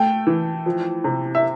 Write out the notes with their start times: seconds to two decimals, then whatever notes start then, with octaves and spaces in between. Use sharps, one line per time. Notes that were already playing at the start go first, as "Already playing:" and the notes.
Already playing: A3 G5
0.27 E3
0.66 F3
1.04 C3
1.35 E5